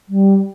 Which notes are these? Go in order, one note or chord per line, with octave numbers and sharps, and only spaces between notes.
G3